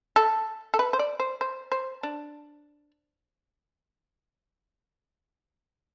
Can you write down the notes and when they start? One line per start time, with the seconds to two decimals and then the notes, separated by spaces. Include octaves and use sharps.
0.16 A4
0.74 A4
0.79 B4
0.93 C5
0.99 D5
1.20 C5
1.41 C5
1.72 C5
2.03 D4